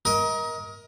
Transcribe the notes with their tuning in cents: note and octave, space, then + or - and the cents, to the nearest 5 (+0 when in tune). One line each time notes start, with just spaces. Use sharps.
A#4 +25 D#5 +30